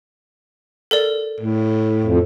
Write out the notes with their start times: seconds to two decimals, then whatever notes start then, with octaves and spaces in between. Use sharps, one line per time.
0.91 A4 A#4 D5
1.41 A2
2.04 F2